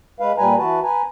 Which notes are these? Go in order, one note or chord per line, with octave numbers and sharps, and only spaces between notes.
G#3 B4 F5
A#2 G3 B4 G#5 A#5
E3 F#4 B4 A5
B4 G#5 A#5